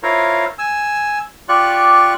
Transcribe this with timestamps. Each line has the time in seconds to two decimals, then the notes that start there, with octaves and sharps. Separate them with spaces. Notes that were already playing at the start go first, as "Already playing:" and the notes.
0.03 E4 F4 A#4 C5 C#5 F5
0.59 G#5 E6
1.49 F4 G4 D5 C#6 F#6